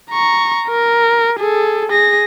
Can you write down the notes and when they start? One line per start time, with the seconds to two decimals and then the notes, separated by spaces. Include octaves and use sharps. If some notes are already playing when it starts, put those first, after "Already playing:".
0.11 A#5 C#6
0.68 A#4
1.39 G#4 A4
1.89 G#4 A#6